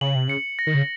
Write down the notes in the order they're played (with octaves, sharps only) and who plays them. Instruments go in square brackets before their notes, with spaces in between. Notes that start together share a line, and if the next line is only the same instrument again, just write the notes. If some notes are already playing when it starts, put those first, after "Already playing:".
[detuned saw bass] C#3 [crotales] F#7
[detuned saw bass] C3
[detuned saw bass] C#3 [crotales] C#7
[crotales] A#6
[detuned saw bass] D#3
C#3